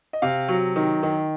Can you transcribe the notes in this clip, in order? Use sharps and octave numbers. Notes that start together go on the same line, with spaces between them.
D#5
C3 F5
F#3
D#3
D#3